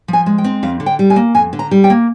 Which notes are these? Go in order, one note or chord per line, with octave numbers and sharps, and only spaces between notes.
F3 G#5
G#3
G5
C4
F2 F5
D3
G5
G3
G#5
A#3
F2 G#5
D3
A#5
G3
G5
A#3